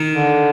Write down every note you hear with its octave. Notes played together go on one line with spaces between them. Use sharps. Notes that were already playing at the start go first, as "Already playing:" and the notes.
Already playing: D#3
D3